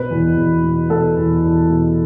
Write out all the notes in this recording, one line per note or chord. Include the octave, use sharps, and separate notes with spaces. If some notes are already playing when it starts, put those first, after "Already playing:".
Already playing: B2 B4
E2
E2
B2
B2 A4
E2
E2
B2